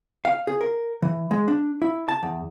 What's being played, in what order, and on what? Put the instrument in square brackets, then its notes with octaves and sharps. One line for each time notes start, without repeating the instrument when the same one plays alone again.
[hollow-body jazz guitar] F5
G#4
A#4
E3
G#3
D4
E4
A5
E2